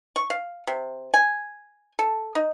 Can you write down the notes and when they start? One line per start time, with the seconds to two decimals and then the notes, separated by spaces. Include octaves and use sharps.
0.16 C#6
0.30 F5
0.67 C3
1.14 G#5
1.99 A4
2.35 D#4